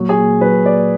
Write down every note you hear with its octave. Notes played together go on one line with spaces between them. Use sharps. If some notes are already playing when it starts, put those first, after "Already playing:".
Already playing: A#2 F#3
G#4
A#2
F#3 B4
A#2 D5